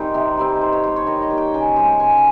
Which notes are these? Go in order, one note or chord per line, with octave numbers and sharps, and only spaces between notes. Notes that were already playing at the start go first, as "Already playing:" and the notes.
Already playing: D#3 G3 C4 D#4
C3
D#3 G3 C4
D#3 C5
C#5
G3 A#3 C5
C#5
D#3 D#5
D#5
G3 A#3
G5
C#3 G#5
G#3 C4 G5
C#3 G#5